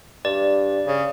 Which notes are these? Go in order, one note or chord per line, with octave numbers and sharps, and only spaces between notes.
G2 D5
C#3